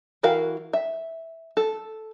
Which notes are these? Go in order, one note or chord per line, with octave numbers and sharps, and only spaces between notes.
E3 F#4 A#4 F5
E5
A4